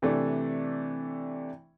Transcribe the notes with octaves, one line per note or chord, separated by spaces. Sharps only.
C3 E3 A3 D4